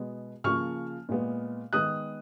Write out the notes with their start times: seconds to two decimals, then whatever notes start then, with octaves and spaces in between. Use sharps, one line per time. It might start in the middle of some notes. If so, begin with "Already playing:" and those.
Already playing: B2 G#3 B3
0.44 C#3 F3 A#3 C#6 F6
1.09 A#2 G#3 B3
1.73 D#3 G#3 B3 D#6 F#6